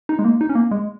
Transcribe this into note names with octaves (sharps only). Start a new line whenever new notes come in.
D#4
G#3
A#3
D#4
C#4
A#3
G#3